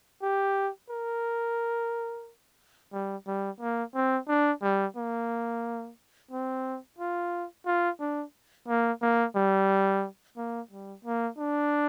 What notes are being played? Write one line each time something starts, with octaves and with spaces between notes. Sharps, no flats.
G4
A#4
G3
G3
A#3
C4
D4
G3
A#3
C4
F4
F4
D4
A#3
A#3
G3
A#3
G3
A#3
D4